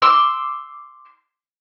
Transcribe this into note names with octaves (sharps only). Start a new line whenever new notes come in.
C6 D6 E6